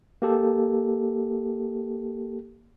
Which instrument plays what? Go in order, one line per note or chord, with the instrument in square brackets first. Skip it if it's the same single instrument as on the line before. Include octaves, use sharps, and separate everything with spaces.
[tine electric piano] A#3 G4 A4